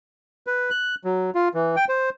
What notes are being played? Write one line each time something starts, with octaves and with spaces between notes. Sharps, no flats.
B4
F#6
F#3
F4
E3
G5
C5